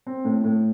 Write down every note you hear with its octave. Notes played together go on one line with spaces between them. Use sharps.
C4
A2
A2